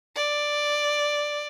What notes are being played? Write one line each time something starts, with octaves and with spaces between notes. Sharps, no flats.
D5